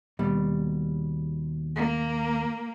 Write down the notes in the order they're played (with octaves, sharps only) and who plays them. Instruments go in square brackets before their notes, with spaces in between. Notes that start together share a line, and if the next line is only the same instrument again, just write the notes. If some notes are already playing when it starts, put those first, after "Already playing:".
[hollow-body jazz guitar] D#2 B2 G3
[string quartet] A#3